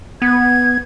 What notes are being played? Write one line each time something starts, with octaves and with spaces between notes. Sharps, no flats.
B3 G#6